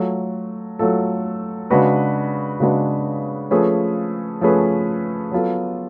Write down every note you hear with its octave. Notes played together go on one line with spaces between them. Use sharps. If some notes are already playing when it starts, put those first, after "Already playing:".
Already playing: F#3 A3 F4 A4
F#3 A3 F4 A4
C#3 G#3 D4 F#4 B4
C#3 G#3 D4 F#4 B4
F3 A3 C#4 G#4 B4
F3 A3 C#4 G#4 B4
F#3 B3 F4 A4